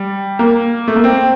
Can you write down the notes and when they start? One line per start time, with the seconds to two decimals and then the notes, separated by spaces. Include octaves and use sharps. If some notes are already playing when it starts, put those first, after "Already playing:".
Already playing: G3
0.39 A#3
0.88 A3
0.96 A#3
1.04 C4